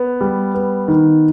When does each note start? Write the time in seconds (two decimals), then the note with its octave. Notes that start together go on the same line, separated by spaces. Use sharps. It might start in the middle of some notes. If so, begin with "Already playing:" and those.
Already playing: B3
0.21 G3
0.54 B3
0.88 D#3